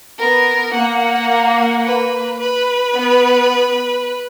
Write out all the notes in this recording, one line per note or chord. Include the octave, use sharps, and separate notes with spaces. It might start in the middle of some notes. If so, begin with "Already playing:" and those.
B3 A#4
A#3 F#5
B4
B4
B3